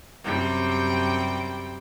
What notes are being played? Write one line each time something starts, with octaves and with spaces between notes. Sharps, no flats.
F#2 C3 G3 G5